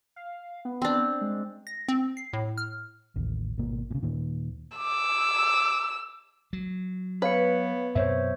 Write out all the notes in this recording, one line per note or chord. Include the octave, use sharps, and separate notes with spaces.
F5
B3
C4 D4
G#3
A#6
C4
C7
A2
F6
A1 D#2
G#1 B2 A#3
A#2 C#3
D#2 A#2 D#3
D6 E6
F#3
B3 B4 C#5 F5 C#7
F#2 B2 C4 C5 C#5 E5